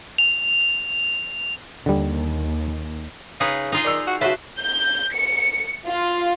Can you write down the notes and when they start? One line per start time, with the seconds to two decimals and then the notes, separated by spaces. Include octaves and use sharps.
0.18 F7
1.86 D#2 D3 G3
3.40 C#3 D#4 G#4 B4
3.72 D#4 F4 G#4
3.85 D#3 D5 E6
4.07 F#4
4.21 C#3 F#4 B4 C5 E5 A5
4.59 G6
5.13 C#7
5.86 F4